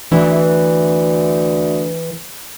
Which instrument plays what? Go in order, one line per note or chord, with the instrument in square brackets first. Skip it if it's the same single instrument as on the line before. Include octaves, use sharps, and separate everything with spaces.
[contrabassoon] D2 [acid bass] E3